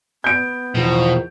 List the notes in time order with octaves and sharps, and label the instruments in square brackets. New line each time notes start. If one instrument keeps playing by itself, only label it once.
[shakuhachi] B3 [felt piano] G6 D7
[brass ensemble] E2 D#3 F3 [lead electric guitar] B2